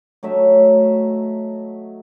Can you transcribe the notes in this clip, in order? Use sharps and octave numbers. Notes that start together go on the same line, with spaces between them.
F#3 A3 D#4 E5